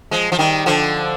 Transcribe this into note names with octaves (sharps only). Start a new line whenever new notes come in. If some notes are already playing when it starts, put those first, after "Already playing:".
F3 G#3
F3
D#3 G3
D3 F3